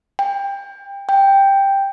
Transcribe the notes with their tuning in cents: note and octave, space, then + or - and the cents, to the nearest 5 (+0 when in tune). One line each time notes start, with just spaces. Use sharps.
G5 +25
G5 +5